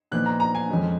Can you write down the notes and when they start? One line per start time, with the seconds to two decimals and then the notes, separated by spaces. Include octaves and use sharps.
0.12 A#2 F3 B3 D#4 F#6
0.26 A#5
0.40 A#5
0.55 G#5
0.69 F2 F3 G#3 C#4